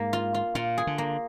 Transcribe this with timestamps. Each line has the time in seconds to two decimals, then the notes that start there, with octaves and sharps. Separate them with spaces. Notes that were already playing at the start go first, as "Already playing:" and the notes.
Already playing: G#2 A#3
0.13 F4
0.34 F4
0.55 A#2 F4
0.78 G#4
0.87 D3
0.98 A#3